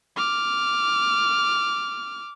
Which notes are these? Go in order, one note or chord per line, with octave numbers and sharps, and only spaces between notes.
D6 F6